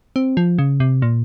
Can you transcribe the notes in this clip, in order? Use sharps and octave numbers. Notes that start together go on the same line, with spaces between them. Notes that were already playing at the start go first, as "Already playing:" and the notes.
C4
F3
C#3
C3
A#2